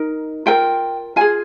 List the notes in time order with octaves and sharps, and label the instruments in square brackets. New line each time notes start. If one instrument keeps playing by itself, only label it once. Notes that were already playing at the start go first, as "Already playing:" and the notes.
Already playing: [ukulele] D#4 A#4
F4 A#4 G5
F4 G#4 G#5